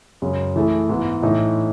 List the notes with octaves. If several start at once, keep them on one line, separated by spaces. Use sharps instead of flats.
F#2 C#3 G#3
E3 A3 E4 G#4
G#2 E3 B3
A2 E3 A3 D#4